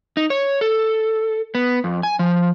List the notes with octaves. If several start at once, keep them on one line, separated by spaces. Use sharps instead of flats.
D#4
C#5
A4
B3
F2
G#5
F3